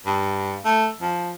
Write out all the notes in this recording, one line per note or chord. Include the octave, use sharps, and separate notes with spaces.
G2
A3
F3